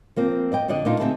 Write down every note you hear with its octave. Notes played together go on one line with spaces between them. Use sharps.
F3 A#3 C4
D5 D#5 G5
F2 D3 D4 D5 D#5
A#2 A3 D4 D#4 F4
D2 C4 D#4 G#4 E5 A5